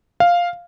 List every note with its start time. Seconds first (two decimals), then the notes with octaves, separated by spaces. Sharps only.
0.20 F5